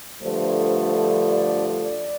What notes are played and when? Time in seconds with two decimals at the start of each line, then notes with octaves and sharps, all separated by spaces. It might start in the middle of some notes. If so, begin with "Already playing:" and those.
0.21 G2 D3 F3 A3 C5
1.28 D5
1.82 D5